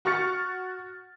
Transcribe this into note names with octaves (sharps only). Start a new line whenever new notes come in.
F#4 C#6 F6 A6 C#7